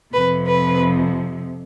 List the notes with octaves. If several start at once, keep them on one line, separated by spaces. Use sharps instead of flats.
F2 C3 F3 B4
B4